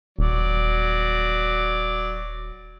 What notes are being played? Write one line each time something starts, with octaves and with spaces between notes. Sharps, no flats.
D#1 F#3 D5